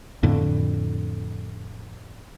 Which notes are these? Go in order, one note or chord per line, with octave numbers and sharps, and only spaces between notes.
F2 A2 D3